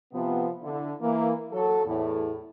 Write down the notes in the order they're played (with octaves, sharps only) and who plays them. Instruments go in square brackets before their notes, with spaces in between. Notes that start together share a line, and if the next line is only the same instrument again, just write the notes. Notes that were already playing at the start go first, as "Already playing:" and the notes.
[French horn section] C3 F3 B3
D3 E4
E3 A#3
F#3 A4
E2 A2